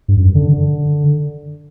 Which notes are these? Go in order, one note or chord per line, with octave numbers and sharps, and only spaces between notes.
G2
F#2
D3
D3